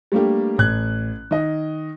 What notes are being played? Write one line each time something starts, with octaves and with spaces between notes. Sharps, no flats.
G3 A3 A#3 D4 G4
A1 F#6 G#6
D#3 D#5